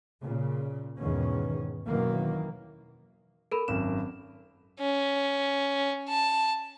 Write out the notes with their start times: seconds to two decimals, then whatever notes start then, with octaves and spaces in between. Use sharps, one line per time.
0.23 A#2 C#3
0.98 E2 G#2 B2 D#3 C#4
1.87 F#2 B2 D#3 E3 F#3 A#3
3.52 A4 A#4 B5
3.68 G#1 F#2 E7
4.79 C#4
6.09 A5